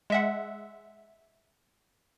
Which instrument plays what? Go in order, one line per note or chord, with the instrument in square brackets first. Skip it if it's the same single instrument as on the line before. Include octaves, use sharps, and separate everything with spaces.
[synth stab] G#3 E5 F#5